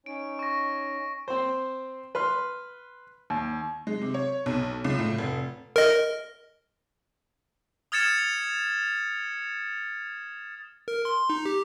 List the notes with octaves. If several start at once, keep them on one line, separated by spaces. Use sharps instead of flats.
C#4 D#4 C#5 D7
C#6 A#6
C4 C5
B4 C6 F6
D#2
G#3
C3
C#5
B1
C#2
A2
F1
A#4 D#5
D#6 F6 G#6 A6 C#7 E7
A#4
C6
D#4
G4